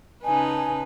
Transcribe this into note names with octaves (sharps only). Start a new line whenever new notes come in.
C#3 D#4 B4 G#5 A5